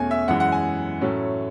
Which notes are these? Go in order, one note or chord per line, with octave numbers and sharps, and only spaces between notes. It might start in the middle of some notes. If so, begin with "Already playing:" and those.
Already playing: E2 B2 A3 C#4 G#5
E5
F#2 E3 G#3 F#5
F#5
G#5
A2 F#3 A3 C#4